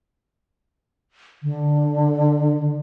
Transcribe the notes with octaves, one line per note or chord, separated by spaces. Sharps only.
D3